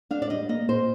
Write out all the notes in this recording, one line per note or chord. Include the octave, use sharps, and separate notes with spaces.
D4 F5
D5
G3 D#5
A#3 D#5
A#2 C5